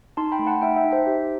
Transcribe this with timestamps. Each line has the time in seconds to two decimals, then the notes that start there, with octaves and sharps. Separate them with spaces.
0.17 D#4 A5 C6
0.31 G5 B5
0.39 A3
0.47 F#5 A5
0.61 D#4 E5 G5
0.76 E5 G5
0.84 D#4
0.92 C5 E5
1.07 G4